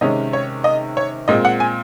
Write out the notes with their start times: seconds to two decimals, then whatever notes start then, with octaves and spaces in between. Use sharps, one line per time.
0.01 C3 D#3 G#3 C#4 D#5
0.33 C#5
0.64 D#5
0.97 C#5
1.28 A#2 G#3 C4 D#5
1.45 F#5
1.60 G#5